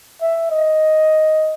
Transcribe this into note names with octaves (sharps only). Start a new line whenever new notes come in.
E5
D#5